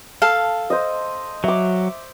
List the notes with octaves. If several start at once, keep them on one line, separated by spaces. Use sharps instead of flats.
A4 F5
C5 D#5
F#3 E5 D6